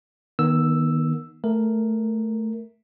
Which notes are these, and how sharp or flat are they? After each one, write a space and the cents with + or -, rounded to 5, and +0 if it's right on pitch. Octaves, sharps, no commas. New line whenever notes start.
D#3 +0 B3 -35 E6 +0
A3 +0 A#4 +0